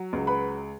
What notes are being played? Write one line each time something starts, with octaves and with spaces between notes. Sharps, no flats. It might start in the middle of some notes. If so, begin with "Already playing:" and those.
Already playing: F#3
C#2
B4 B5